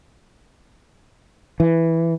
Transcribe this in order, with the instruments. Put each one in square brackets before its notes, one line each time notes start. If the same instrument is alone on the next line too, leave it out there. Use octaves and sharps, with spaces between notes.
[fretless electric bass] E3